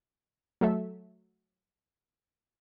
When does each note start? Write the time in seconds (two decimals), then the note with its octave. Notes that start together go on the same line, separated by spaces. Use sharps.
0.61 F#3 A3 A4 E5